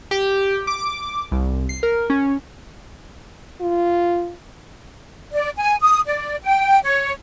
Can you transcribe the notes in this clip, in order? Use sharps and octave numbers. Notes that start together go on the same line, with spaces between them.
G4
D6
C2
C7
A#4
C#4
F4
D5
G#5
D#6
D5
G5
C#5